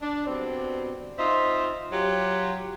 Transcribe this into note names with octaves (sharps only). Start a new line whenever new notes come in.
D4
B2 D3 G3 C4
C4 D#4 F4 D#5 E5
F#3 F4 G4